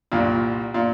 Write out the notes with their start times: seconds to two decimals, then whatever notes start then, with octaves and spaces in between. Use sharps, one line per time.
0.12 C2 A#2
0.74 A#2